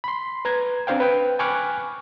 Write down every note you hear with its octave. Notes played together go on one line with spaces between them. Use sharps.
B5 C6
B4 A#5 G#6
C4 D4 C5 F5 G5
B4 G5
G#5 B5 C#6 D6 F6 F#6